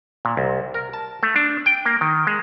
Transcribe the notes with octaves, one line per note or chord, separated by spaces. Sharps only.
A#2
C2
A#4
A5
A3
D4
G5
A#3
D#3
G#3